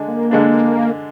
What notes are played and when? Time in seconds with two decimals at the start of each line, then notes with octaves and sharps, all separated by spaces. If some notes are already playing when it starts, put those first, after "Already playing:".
Already playing: D3 G#3 D4
0.08 A#3
0.31 D3 G#3 D4